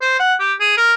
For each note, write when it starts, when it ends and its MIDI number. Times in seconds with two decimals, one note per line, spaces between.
0.02 0.17 72
0.20 0.34 78
0.40 0.53 67
0.60 0.76 68
0.78 0.94 70